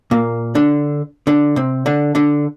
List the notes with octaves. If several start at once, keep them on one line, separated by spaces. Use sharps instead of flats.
A#2 A#3
D3 D4
D3 D4
C3 C4
D3 D4
D3 D4